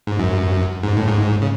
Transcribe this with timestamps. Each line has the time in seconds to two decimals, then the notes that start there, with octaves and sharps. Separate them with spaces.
0.07 G#2
0.19 F#2
0.83 G#2
0.97 A2
1.08 G#2
1.42 C#3